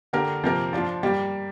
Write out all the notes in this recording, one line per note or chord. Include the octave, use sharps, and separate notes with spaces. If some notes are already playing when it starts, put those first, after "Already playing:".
D3 A#3 G4 A#4
C3 F3 A#3 G4 A#4
F3 D4 F4
G3 A#3 G4